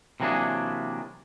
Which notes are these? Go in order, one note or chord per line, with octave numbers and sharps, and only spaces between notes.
C3 E3 F#3 A#3 D4 G#4